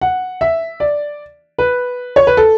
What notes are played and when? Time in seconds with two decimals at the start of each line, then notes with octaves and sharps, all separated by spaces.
0.02 F#5
0.41 E5
0.80 D5
1.58 B4
2.16 C#5
2.27 B4
2.37 A4